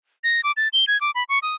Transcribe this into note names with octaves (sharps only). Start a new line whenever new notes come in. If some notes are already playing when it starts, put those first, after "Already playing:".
A#6
D6
A6
G7
G#6
D6
B5
C#6
D#6